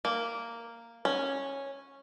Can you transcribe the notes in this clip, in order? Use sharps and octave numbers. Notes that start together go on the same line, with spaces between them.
A#3
C#4